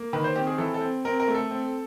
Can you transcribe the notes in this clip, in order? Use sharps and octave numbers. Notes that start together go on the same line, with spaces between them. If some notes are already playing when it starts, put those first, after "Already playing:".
Already playing: A#3
D#3 B4
C5
C4 G4
G#4
E3 A4
A4
C4
C4 A#4
A#4
A3
A4
C4